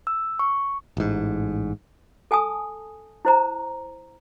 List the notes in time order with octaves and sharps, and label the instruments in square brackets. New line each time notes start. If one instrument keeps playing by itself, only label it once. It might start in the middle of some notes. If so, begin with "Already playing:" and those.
[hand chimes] E6
C#6
[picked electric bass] A1 G#2
[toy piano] A4 G#5 A5 D#6
E4 C5 A#5